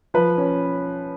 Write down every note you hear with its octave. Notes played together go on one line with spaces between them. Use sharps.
F3 B4
C#4